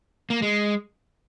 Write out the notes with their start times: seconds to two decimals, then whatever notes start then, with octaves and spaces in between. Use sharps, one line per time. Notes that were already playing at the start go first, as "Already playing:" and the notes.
0.30 A#3
0.42 G#3